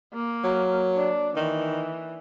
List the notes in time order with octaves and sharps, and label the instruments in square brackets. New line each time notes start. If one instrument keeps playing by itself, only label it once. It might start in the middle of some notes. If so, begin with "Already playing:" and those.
[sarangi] A#3
[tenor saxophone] F#3
[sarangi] D4
[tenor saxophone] D#3 [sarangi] E3